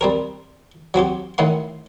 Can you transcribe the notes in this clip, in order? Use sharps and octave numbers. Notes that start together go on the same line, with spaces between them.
G3 C4 A#4
F#3 C4 F#4 G4
A1 A2 D#3 F#5 C6